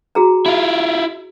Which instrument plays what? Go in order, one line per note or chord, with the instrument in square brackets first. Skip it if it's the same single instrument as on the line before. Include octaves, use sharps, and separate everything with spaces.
[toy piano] F#4 G#4 A#5
[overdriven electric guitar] E4 F4